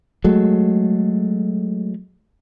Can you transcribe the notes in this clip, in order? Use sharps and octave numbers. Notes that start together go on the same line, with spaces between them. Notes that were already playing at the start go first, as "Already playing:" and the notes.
F#3 G#3 A3